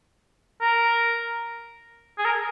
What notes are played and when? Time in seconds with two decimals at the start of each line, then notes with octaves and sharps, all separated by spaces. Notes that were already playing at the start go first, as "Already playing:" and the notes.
0.61 A#4
2.18 G#4
2.25 A#4